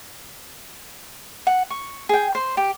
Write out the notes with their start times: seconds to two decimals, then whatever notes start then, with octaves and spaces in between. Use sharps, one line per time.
1.47 F#5
1.70 C#6
2.09 G#4 G5
2.35 C5
2.57 G4